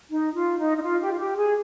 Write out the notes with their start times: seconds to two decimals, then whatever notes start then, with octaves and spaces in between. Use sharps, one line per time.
0.11 D#4
0.34 F4
0.59 D#4
0.77 D#4
0.83 F4
1.01 G4
1.12 F4
1.19 G4
1.37 G#4